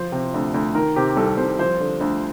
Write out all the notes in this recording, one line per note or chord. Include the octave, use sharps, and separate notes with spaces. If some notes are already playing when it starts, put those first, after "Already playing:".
Already playing: F3 C5
C3
D2
D2
D#3 A#4
C3 G4
C2 A4
C2 C5
F3 C5
D3
D2